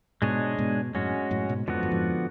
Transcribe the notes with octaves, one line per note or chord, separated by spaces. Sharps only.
G#2 B2 G#3 D4 G#4 C#5
G#2 B2
F#2 A2 G#3 C#4 F#4
F#2 A2
G#2 B2
F2 G#2 D3 F3 B3 F#4
F#2
F2 G#2